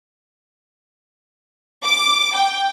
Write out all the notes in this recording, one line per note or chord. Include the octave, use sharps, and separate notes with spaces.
D6
G5